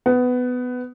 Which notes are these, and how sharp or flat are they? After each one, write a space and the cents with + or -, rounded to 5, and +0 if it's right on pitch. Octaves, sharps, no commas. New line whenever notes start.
B3 +15